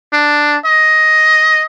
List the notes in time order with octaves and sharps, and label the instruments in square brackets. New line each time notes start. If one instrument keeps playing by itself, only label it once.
[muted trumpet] D4
D#5